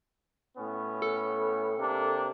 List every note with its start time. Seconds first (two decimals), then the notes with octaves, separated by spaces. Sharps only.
0.56 A2 B3 C#4
1.02 A4
1.77 C3 A#3 D4